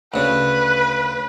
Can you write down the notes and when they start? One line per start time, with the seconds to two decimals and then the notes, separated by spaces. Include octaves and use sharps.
0.14 D2 C#3 B4